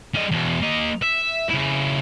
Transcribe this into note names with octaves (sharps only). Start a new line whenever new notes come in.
G3 D#5
E2 B2
A#3 D#5
E5
C#3 E4